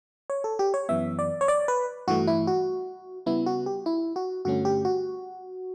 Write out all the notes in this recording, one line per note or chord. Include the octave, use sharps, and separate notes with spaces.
C#5
A4
G4
C#5
F#2 E3 B3 E5
D5
C#5
D5
B4
G2 E3 A3 F#4
E4
F#4
C#3 G3 B3 E4
F#4
G4
E4
F#4
G2 D3 A3 C#4 F#4
G4
F#4